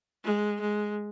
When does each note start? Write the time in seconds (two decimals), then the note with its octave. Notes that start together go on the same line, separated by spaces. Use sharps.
0.24 G#3
0.60 G#3